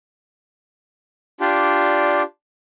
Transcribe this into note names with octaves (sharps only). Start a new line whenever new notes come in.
D4 F4 G4 D5